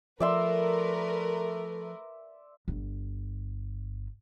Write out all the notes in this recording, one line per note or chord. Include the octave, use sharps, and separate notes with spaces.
F3 A3 A#4 B4 D5 E5 C6
G1